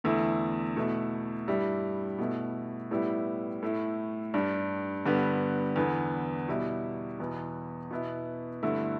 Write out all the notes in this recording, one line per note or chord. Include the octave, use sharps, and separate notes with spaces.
E2 D3 A3 E4
B2 A3 E4
G2 G3 E4
B2 A3 E4
A2 G3 B3 E4
A2 A3 E4
G2 G3 D4
G2 D3 G3 B3
E2 D3 B3
B2 G3 E4
E2 B2 B3
B2 B3 E4
G2 D3 A3 E4